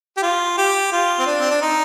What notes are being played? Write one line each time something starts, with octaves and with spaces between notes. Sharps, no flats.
G4
F4
G4
F4
C4
D4
C4
D4
D#4